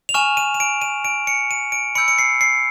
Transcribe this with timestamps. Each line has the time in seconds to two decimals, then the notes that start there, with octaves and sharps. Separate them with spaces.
0.09 F7
0.14 G#5 C#6 F6 E7
0.37 D#7
0.54 D#7
0.60 D7
0.82 D#7
1.05 D7
1.27 C#7
1.51 D#7
1.72 D7
1.95 B5 E6 G6 C#7
2.08 C#7
2.18 C7
2.41 C7